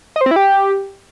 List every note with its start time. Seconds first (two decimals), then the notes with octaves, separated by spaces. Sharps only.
0.16 D#5
0.21 C5
0.26 C4
0.31 E4
0.36 G4